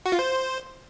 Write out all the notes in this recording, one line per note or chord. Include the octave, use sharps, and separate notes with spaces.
F#4
F4
C5